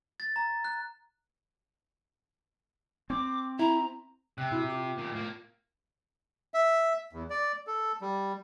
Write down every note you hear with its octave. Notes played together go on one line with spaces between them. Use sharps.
A6
A#5
F#6
C4 D6
E4 A#5
C3 G5 F#6
A#2 E4 F#4
F4 D6
A#2 D#3
A2 A#3
E5
E2
D5
A4
G3